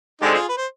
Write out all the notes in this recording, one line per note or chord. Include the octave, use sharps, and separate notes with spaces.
D3 G#3 C4 D#4 G4
F4 G#4
B4
C5